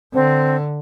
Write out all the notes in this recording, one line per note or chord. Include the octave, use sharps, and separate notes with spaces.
D3 C4